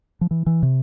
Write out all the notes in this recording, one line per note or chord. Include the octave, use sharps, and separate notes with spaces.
F3
E3
E3
C3